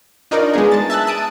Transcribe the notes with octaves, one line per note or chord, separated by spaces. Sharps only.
D4 D#4 F4 A#4 C#5 D5
G#3 B3 G#4
A5 A6
E5 A5 E6 F#6
A5 D#6 D7